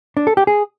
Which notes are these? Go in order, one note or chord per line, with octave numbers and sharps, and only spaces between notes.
D4
A4
G4
G#4